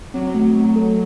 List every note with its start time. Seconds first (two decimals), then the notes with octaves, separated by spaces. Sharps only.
0.14 F#3 C4
0.35 A3
0.56 A3
0.76 A4